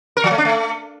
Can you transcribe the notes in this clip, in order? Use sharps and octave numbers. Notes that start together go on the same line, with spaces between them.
A#4
F3
A3
D4
A3